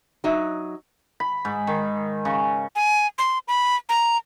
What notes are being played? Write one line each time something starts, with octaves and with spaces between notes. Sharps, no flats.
F#3 D#4 F#4 D#5 E5
B5
G#2
D#3
C#3
G#5
C6
B5
A#5